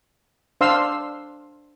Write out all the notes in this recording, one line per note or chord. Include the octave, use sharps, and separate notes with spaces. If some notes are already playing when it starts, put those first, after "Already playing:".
D4 C5 F5 C6 E6